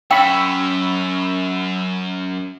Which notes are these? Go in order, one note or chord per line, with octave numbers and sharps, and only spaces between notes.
F#2 G5 B5 C#6 E6